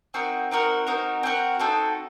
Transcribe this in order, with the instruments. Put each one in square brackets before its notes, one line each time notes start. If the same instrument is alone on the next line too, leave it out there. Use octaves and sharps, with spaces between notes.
[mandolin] C4 D#4 F#4 A#4
C4 D#4 F#4 A#4
C4 D#4 F#4 A#4
C4 D#4 F#4 A#4
C4 D#4 F#4 A4